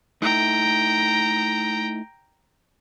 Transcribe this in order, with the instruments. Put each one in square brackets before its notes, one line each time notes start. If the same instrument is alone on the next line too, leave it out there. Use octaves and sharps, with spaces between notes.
[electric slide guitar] A3 D#4 E4 [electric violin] G5 A#5